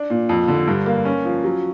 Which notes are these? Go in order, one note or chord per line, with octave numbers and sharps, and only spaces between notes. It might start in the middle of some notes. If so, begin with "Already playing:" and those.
Already playing: D4
A#2
F2
D3
G2
A#3
C#4
F3
F#3